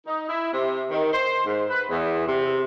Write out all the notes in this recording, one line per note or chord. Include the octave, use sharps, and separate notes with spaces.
D#4
E4
C3
D#3
C5
G#2
B4
E2
C3